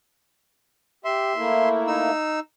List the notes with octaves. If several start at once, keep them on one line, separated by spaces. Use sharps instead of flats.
G4 E5 C6
A3 A#3 E4
D#4 E6